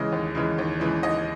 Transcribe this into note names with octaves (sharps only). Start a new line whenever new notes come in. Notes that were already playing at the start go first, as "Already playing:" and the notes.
Already playing: C#3 E3 G#3 D#5
D#2
C#3 E3 G#3
D#2
C#3 E3 G#3
D#2 D#5